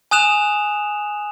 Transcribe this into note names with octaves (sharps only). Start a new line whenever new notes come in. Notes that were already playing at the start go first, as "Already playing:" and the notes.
G#5 D#6 F#6 E7 F7